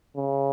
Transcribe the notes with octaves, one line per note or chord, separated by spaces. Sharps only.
C#3